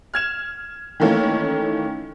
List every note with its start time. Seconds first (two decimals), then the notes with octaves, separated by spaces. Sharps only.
0.14 F6 G#6 E7
1.00 D#3 E3 A3 A#3 C#4